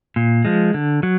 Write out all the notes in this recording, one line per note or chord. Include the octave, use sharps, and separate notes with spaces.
A#2
F3 G#3
D3
F#3